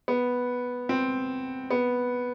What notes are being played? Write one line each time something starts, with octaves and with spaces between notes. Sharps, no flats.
B3
C4
B3